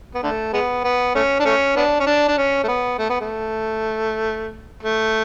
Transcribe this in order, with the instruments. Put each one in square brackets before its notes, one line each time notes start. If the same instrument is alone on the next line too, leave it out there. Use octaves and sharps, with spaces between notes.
[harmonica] B3
D3 A3
G#3 B3
B3
A3 C#4
D4
A3 C#4
B3 D4
C#4
D4
D4
C#4
A3
B3
A3
B3
A3
A3